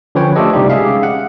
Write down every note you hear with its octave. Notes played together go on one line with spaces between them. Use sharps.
D3 F3 C#4 B4 C#5 G5
A3 D4 F4 G4 A4 D#5
C3 G3 D#4 G4
G#3 C#4 G#4 E5 F5
F#5